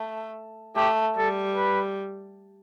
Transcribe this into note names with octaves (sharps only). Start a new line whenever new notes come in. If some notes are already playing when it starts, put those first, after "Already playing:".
Already playing: A3
A3 G4
G3 A4
B4